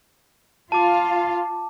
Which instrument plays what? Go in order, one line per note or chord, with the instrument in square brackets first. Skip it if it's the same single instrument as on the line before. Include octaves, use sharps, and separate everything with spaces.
[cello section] F4 F5 [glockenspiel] A5 D6